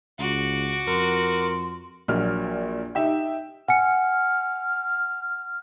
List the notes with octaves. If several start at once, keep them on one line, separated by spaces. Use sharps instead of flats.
C#2 F#4 D6
F2 A#4 C6
A#1 A#2 F#3 F6
D#4 G4 E5 G5
F#5 G#5 F6 C#7